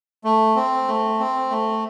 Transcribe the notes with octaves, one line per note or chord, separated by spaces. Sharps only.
A3
C4
A3
C4
A3